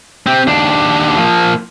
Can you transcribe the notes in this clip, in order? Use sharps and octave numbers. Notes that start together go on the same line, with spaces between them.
C4 G4
D#2 D4
F3 A#3